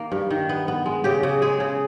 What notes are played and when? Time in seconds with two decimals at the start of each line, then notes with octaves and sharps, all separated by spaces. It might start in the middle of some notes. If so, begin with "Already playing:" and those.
Already playing: D#3 A#3
0.12 G2
0.31 D#3
0.49 B3
0.68 B3
0.86 G#3
1.04 C#3 G4
1.23 C#3
1.42 G#3 G#4
1.60 C#3